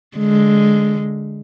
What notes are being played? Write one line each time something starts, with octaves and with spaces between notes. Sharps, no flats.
D3 G#3